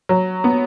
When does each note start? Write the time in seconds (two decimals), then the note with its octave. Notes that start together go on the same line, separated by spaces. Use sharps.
0.09 F#3
0.44 B3